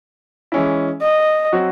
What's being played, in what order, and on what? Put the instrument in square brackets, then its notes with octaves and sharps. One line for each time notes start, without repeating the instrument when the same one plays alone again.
[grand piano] E3 G#3 C#4 E4
[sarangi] D#5
[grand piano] F#3 C4 F#4